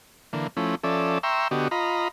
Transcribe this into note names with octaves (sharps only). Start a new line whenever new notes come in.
D3 E3 A#3
F3 A3 C#4 E4
F3 C#4 A4 D5 E5
E5 G5 A#5 C6 C#6 E6
D3 B3 F#4 G4 D#5
F4 D#5 A#5 B5